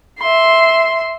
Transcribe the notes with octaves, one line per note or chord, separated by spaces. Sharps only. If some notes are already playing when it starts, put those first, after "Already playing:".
E5 C6